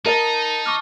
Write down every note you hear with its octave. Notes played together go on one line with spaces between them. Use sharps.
D#4 A#4 D#5 A5 A6
C#6 D6 F6